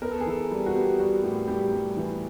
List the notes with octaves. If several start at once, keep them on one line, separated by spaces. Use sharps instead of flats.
B3 A#4
A4
G#4
E3 A4
G3
F#4
B3 G4
G3 F#4
A2 G4
G3 G4
G3
E3